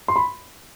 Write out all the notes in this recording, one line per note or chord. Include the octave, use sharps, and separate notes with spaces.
C6
B5